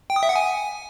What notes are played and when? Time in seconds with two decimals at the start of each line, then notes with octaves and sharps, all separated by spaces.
0.10 G5
0.16 D#6
0.23 E5
0.29 F#5
0.36 G#5